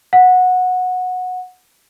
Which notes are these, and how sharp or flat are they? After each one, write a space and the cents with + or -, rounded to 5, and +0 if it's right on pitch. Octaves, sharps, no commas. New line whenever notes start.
F#5 -15